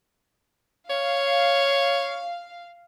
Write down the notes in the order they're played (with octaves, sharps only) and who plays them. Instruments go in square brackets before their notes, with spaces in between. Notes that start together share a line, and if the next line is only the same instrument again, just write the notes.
[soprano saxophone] C#5 [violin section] F5